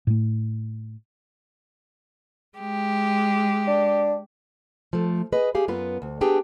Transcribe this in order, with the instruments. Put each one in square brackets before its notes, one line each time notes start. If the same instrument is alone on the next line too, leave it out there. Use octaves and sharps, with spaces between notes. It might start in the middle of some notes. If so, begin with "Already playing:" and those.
[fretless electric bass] A2 A3
[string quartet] G#3 G4
[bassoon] D4
[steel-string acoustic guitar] F3 A3
G#4 B4 D#5
G4 G#4 F5
F#2 B3 F4 B4
D2
B3 D4 G4 G#4 G5